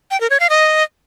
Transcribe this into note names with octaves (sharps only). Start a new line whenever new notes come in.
G5
A#4
C#5
F5
D#5